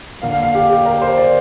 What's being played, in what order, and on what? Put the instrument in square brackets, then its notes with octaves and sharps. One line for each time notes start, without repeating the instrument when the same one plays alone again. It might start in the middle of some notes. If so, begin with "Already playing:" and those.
[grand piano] D3 A#3 F5
F5
F5
G4
G4
A#4
C5
D5